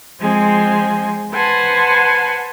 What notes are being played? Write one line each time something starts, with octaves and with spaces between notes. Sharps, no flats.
F3 G#3 C4 G#5
B4 C5 F#5 G#5 A5 C6